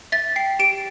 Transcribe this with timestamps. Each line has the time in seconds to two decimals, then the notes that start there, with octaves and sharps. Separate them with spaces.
0.12 E5 A6
0.36 G5 C7
0.59 G4 D7